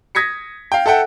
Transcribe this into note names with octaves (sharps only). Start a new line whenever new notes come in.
D#6 G#6 A#6 B6 C#7
F5 G5
A4 E5 F#5 G5